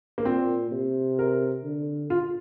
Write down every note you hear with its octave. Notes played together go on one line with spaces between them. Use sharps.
A#3
A#2 C4
C3
A#4
D3
F4